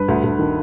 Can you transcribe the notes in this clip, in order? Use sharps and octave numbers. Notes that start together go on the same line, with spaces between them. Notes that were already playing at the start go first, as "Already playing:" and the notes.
Already playing: G2 B4
D2
D2
D#3